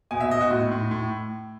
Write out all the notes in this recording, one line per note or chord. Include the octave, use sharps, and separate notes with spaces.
B2 G#5
E5
B2 D#5
F#4
A2
A2
A2